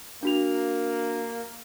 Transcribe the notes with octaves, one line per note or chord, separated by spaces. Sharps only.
A#3 D4 F#4 F7